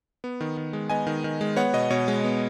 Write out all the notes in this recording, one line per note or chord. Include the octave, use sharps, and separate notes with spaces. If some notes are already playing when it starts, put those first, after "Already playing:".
B3
D#3
D#3
G#3
B3 D#5 G#5
D#3
D#3
G#3
B3 C#5 F#5
B2 D#5
B2 C#5
G#3
B3